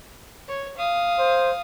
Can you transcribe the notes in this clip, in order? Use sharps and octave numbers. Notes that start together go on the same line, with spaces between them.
C#5
F5 D#6
C5